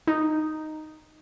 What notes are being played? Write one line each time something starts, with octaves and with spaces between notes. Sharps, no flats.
D#4